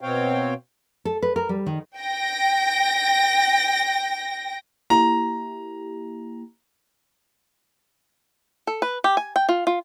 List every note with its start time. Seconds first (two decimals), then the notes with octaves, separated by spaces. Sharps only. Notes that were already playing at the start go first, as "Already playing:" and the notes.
0.01 B2 C4 C5 C#5 F5 G5
1.05 A4
1.22 B4
1.36 A#4
1.49 G3
1.66 D#3
1.98 G5 A#6
4.90 A#3 E4 G4 A#5
8.67 A4
8.82 B4
9.04 G4
9.17 G#5
9.36 G5
9.49 F4
9.67 F4